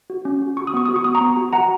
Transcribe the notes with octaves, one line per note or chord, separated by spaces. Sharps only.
F#4
C#4
F#4
F#4 C#6
D#6
B3 C#6
F#4 D#6
C#6
B3 D#6
A#5 C#6
B3
F#4
F#4 F#5 A#5